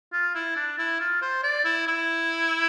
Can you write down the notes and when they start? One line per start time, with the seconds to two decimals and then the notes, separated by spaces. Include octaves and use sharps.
0.13 F4
0.35 E4
0.56 D4
0.78 E4
1.00 F4
1.22 C5
1.43 D5
1.65 E4
1.88 E4